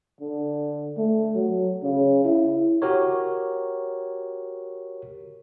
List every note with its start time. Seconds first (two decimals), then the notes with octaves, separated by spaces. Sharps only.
0.21 D3
0.97 A3
1.35 F#3
1.83 C#3
2.25 E4
2.82 F#4 G4 A#4 C#5